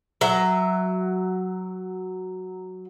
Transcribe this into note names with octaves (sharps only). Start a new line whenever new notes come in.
F#3 E5